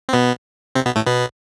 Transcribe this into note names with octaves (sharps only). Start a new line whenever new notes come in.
C4
B2 B3
C3 C4
B2 B3
A2 A3
B2 B3